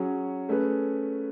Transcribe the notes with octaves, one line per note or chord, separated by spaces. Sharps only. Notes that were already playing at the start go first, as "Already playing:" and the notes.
Already playing: F#3 C#4 G#4 C#5
A3 C#4 G#4 B4